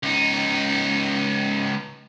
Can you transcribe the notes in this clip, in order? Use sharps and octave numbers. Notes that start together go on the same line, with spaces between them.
C#2 D#4